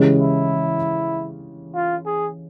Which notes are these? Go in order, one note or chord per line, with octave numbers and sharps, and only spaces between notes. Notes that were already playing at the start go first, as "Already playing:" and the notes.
Already playing: C#3 E3 G#3 C#4 G4
E4
F4
G#4